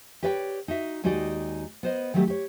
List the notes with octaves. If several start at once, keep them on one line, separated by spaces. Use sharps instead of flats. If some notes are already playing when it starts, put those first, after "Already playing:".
G4 B4 C#5 D5 E5 G5
D#4 F#4 E5
D#2 G#3 D#4 F#4 G4 D5
B3 C5 D#5
D#3 F#3 G3 A3 G4
G4 C#5